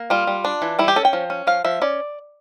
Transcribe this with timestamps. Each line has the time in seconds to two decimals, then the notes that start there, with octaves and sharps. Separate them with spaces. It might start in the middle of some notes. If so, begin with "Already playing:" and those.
Already playing: A#3
0.10 G3 F4
0.27 G3
0.45 D4
0.62 E3
0.79 G3 E4
0.88 G4
0.96 C#4 A4
1.05 G5
1.13 F3
1.30 C#4
1.47 F3 F5
1.64 F3 E5
1.81 C#4 D5